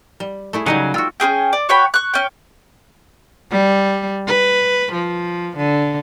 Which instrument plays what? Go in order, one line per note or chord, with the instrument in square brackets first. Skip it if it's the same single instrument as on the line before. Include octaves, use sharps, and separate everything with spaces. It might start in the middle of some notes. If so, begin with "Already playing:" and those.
[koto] G3
A3 E4 G#4
[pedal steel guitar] C#3 F#3 G#5 [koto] G3 D#4 F#5
[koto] F4 F#4 [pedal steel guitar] G5 E6
[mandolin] C#4 F#4 G#4 G5
D5
F#4 C#5 G5 B5
C#6 F#6
C#4 G5
[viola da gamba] G3
B4
F3
D3